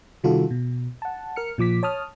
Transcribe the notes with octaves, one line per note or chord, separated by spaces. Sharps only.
C3 D#3 G3 F4 F#4 A4
B2
F#5 A5
A#4 F6 C#7
A#2 F3 D6 B6
C#5 A5 D#6 F6